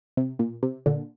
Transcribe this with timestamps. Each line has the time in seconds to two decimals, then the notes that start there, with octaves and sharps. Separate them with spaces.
0.17 C3
0.39 A#2
0.63 C3
0.86 A#2 D3